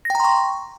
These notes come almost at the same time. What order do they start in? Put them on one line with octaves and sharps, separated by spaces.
A#6 G5 A#5 C6 C#6